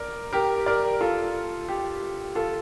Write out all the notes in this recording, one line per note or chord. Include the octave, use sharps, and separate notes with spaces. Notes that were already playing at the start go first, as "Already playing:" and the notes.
Already playing: A#4 D5
G4 A#4
A#4 D5
F4 A4
G4
F4 A4